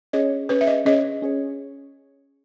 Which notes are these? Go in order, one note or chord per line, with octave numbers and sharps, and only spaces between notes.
C#4 G#4 C#5 D#5
C#4 G#4 B4 C#5
E5
D#5
C#4 G#4 C#5 D#5
C#4 G#4 C#5